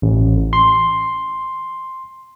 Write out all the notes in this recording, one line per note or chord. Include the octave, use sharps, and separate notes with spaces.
A1
C6